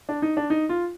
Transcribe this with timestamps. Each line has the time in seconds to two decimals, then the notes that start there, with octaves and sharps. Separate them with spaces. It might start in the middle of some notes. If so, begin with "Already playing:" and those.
0.09 D4
0.22 D#4
0.37 D4
0.50 D#4
0.69 F4